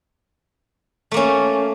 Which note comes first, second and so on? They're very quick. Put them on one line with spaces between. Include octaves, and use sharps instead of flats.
A3 A#3 C#4